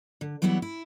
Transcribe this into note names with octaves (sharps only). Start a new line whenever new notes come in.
D3
E3 F#3 G3 B3 E4 F#5
E4